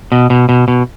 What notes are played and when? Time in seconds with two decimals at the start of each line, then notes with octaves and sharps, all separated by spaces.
0.12 B2
0.30 B2
0.49 B2
0.68 B2